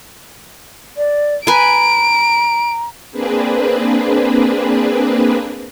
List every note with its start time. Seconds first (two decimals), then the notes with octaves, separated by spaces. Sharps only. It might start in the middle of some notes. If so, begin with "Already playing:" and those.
0.97 D5
1.47 B4 G#5 A#5 D7
3.12 A#3 C4 D4 G#4 B4